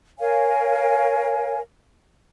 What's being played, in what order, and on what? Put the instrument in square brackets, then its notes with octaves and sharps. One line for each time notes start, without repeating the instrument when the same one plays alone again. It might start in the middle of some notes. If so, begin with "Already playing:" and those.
[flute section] A#4 C#5 F5 G#5